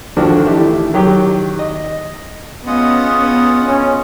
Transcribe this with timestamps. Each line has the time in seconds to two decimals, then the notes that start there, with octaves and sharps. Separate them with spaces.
0.17 D3 D#3 F3 D4 F#4
0.46 E3 A3 E4 G4
0.94 D#3 F#3 G4
1.59 D#5
2.67 B3 C#4 F4 G#4 D#5 F#5
3.68 C#4